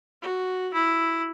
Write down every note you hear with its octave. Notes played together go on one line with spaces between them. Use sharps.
F#4
E4